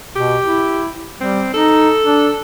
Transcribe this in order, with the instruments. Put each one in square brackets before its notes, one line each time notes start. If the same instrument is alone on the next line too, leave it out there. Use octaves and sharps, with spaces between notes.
[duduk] B2 [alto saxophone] G4
[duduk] E4
[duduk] G3 [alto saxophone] C4
[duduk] D#4 [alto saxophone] A4
[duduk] D4